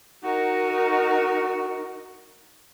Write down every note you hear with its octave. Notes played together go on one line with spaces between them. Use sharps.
D#4 F#4 A#4